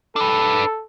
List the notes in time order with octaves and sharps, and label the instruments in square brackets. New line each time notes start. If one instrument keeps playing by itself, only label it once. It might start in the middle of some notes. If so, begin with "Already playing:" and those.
[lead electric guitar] D4 B4 [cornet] A4